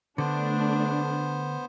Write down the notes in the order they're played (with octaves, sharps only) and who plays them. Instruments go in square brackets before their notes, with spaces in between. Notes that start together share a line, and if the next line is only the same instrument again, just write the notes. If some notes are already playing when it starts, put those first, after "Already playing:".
[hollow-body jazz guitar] D3 [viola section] A3 D4 [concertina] B3 C5